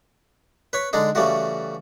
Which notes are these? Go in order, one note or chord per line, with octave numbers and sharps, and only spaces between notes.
B4 C#5 B5
D3 G#3 D4 D#4
C#3 E3 G3 A3 F#4